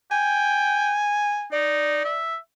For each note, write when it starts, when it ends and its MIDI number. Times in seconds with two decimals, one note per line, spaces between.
0.11 1.00 79
0.11 1.47 80
1.53 2.01 63
1.53 2.21 74
2.05 2.38 76